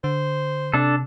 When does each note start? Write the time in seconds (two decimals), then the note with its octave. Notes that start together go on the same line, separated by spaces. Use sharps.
0.04 D3 C5
0.74 C3 D4 A4